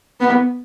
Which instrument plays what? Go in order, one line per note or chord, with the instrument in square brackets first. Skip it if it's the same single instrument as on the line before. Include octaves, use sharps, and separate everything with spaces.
[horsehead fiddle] B3